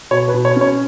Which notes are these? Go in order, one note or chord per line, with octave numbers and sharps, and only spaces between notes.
B2 C#5
B4
B2
C#5
C#4 C#5